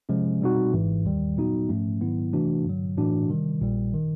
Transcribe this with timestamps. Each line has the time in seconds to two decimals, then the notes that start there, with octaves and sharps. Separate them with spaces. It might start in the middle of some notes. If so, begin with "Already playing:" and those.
0.09 C3 F3 G#3 C#4
0.41 B2 G3 C4 D#4 F#4
0.73 G#1 G#2 E3
1.05 D#2 D#3 G3
1.37 A#2 F#3 B3 D#4 F#4
1.69 G#2 F3 A3 C#4
2.01 G#2 D#3 F#3 B3 E4
2.33 C3 E3 A3 D4 F#4
2.65 G2 D3 F#3
2.97 A2 E3 A3 D4 F#4
3.28 C3 D#3 G3
3.61 A#1 A#2 G3
3.94 D#3